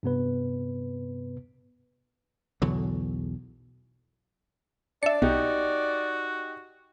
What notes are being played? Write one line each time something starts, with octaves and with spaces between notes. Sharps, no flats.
G2 C3 B3 B4
B1 E2 D3 F#3
D4 D5 E5 A5 C#7
B1 D#4 F#4 G4